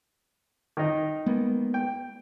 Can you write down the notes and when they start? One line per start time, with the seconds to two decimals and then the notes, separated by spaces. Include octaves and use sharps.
0.77 D#3 D#4
1.26 G#3 A#3 B3
1.74 G5